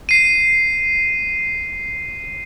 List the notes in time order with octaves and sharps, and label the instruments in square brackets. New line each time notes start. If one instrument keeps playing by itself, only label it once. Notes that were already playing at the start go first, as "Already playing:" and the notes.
[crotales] C7 D#7